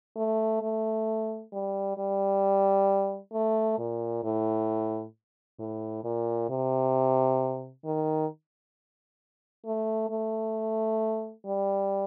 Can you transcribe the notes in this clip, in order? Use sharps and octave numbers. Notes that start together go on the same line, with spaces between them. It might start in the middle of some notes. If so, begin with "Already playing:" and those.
A3
A3
G3
G3
A3
A#2
A2
A2
A#2
C3
D#3
A3
A3
G3